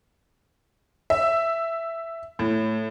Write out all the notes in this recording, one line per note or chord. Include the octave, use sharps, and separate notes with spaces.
E5
A2